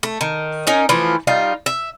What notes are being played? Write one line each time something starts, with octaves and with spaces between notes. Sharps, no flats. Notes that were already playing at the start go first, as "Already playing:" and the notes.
A3
D#3
C#4 D#4 A#4
E3 F3 A3
G3 D#4 F4
E5